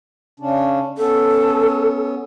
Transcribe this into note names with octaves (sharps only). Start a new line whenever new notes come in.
C#3 C#4 D4
B3 C#4 A4